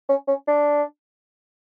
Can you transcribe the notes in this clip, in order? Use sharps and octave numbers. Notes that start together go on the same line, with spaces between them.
C#4
C#4
D4